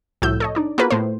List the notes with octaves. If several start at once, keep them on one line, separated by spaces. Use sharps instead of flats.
C2 A2 F3 F#4 E6 G6
A4 C#5 D#5
D4 D#4 D5
A#3 B3 F4 F#4 G#4 B4
A2 C5